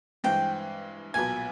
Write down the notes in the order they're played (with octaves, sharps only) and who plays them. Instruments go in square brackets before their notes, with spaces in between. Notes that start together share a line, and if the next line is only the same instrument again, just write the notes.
[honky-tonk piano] G2 E3 G#3 C4 [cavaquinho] G5
[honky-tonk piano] B1 A#2 F#3 B3 [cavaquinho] G#5